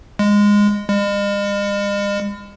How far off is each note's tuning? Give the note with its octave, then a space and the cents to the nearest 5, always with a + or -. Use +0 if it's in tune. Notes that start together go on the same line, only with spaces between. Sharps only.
G#3 -15
G#3 -45